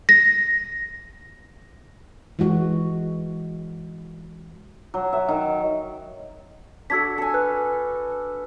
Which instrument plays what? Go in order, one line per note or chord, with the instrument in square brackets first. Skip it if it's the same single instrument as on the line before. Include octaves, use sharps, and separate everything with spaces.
[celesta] A#6
[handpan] E3 G#3 F#4
[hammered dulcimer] F#3
E5
D#3
[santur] D4 F#4 A4 [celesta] E6 G#6 B6
[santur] A4 G#5
[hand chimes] B4 [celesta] F#6